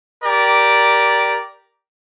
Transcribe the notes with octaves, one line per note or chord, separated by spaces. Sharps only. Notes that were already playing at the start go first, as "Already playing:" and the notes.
G4 A#4 D5